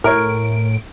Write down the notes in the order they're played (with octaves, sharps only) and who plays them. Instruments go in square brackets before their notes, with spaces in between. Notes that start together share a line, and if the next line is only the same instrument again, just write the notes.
[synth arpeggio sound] A2 D7 [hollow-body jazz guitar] A#4 C#5